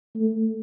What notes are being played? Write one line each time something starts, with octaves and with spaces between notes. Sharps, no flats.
A3